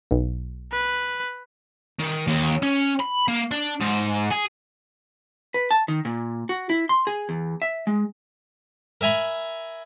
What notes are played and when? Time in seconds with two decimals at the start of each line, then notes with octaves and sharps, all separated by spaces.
0.11 B1
0.72 B4
1.99 D#3
2.27 D#2
2.63 C#4
3.00 B5
3.28 A#3
3.51 D4
3.81 G#2
4.32 G#4
5.54 B4
5.71 A5
5.88 D#3
6.05 A#2
6.49 F#4
6.70 E4
6.89 C6
7.07 G#4
7.29 E2
7.62 E5
7.87 G#3
9.01 A#4 E5 G#5 A#5 B5